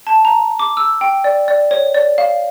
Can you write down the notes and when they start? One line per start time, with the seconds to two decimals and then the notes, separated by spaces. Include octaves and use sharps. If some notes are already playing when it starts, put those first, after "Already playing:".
0.07 A5
0.25 A#5
0.59 D6
0.77 E6
1.01 G5
1.24 D5
1.48 D5
1.71 C#5
1.95 D5
2.18 F5